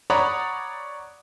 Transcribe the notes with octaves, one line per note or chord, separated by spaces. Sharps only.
C#5 D5 F#5 A#5 B5 D#6